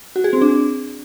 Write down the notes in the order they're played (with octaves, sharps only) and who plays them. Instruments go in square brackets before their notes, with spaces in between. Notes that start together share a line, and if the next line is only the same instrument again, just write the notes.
[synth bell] F#4
G#4
C4
D4